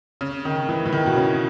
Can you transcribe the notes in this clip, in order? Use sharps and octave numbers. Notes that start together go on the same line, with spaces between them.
C#3
D#3
E3
E3
D#3
B2
C#3